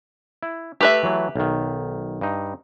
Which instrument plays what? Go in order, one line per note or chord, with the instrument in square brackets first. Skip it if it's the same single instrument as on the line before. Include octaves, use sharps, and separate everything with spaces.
[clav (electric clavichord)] E4
[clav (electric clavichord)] A3 [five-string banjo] G4 B4 E5
[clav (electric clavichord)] E3 F#3 A3
B1 D#3
G2 D#4